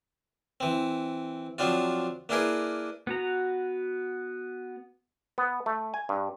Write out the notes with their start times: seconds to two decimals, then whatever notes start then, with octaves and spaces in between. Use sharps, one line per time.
0.60 E3 C4
1.58 F3 F#3 C4 D4 F4
2.29 A#3 D4 E4 G#4 A#4 B4
3.07 B3 F#4 A#5
5.38 B3
5.66 A3
5.94 G#5
6.09 G2